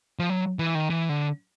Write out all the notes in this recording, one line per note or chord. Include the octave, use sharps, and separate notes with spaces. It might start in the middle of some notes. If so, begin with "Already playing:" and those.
F3
F#3
E3
D#3
E3
D3